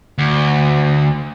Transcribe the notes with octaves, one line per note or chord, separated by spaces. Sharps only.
D2